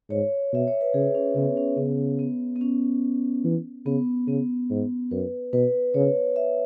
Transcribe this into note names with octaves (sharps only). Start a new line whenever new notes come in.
G#2 C#5
B2 E5
C#5
B4
C#3 G#4
C#4
C#3 B3
C#4
C#3 B3
B3
B3
C#4
E3
C#3 B3
C#3 B3
G#2
F#2 B4
B2 B4
C#3 C#5
E5